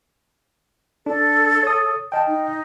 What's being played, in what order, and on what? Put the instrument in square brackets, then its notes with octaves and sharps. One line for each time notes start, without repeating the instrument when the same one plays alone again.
[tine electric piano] D4 [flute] A4
[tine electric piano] C#5 D#6
[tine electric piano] D#5 G5 [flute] A5
[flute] D#4